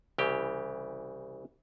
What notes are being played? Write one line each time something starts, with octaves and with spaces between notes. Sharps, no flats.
C2 C#3 E3 G4